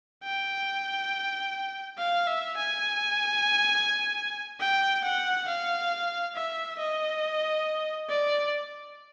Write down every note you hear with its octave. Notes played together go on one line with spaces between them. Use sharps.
G5
F5
E5
G#5
G5
F#5
F5
E5
D#5
D5